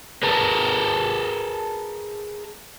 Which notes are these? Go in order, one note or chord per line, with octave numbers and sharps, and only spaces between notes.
G#4 A#4 B4 A5 A#5